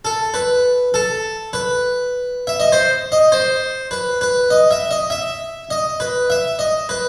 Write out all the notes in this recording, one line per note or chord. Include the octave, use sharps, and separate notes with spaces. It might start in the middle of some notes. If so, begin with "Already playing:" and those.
A4
B4
A4
B4
E5
D#5
C5
D#5
C5
B4
B4
D#5
E5
D#5
E5
D#5
B4
E5
D#5
B4